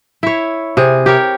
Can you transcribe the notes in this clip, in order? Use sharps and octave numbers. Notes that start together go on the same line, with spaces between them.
E4 C#5
C3 G#4
G4 A#4 C#5